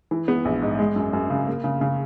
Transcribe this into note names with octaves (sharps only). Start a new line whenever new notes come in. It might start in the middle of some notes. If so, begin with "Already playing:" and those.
E3
B3
A#1
G#2
G#3
F#2
F#2
C#3
A#3
C#3
C#3